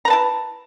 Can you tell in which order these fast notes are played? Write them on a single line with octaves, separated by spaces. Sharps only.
A#5 B4 A5 E4